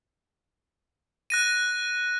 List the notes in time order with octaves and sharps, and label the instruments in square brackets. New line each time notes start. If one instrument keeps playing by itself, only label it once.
[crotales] F#6 A#6 D#7